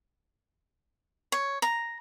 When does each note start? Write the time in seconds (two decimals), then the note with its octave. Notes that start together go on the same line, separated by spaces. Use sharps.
1.32 C#5
1.62 A#5